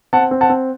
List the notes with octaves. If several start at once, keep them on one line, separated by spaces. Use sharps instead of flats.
C4 F#5 A5
C4
F#5 A5
C4